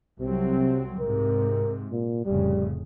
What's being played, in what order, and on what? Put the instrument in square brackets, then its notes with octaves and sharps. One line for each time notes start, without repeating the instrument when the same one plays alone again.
[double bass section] C2 F#3 C4 [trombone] C3
[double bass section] G#2 C3 [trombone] A#4
[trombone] A#2
[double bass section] F1 A2 C#3 [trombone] G3